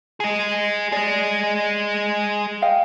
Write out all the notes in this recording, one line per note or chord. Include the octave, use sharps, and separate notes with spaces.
G#4 D#5
G#4 D5 D#5
D#5 F5 G5